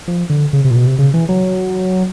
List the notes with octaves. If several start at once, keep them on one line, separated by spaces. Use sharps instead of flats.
F3
D3
C#3
C3
A#2
B2
C3
C#3
E3
F#3